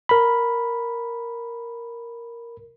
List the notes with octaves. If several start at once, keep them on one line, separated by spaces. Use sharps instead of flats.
A#4 B5